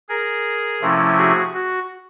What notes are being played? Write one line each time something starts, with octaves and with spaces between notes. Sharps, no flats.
G#4 A#4
C3 F3 A3 C#4 E4
F#4 G#4
F#4